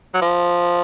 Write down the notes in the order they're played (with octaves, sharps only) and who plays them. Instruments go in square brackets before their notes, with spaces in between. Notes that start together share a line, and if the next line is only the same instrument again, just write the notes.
[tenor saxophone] F#3
F3